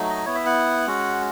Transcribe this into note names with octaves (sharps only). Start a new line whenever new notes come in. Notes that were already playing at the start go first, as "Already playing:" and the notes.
Already playing: F#3 A3 D#4
D#5
B3 E4 C#5
E5
F#5
G#3 C#4 F#4